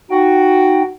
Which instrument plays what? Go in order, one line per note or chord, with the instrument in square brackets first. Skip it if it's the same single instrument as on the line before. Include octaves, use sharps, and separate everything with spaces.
[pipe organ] D#4 G5 [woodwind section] F#4